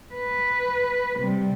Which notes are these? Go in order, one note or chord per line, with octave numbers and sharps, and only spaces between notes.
B4
C3 G3